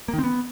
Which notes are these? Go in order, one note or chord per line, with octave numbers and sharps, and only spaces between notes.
A#3
D#3
C4
B3